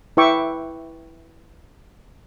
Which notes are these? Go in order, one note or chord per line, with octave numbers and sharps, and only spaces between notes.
E4 B4 E5 G5 C#6 D6